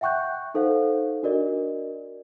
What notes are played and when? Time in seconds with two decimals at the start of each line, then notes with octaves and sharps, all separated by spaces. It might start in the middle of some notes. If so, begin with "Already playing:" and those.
0.01 E5 F#5 G5 C#6 F#6 G6
0.54 D#4 A4 C5 F5 F#5
1.23 D4 F#4 A#4 D5 D#5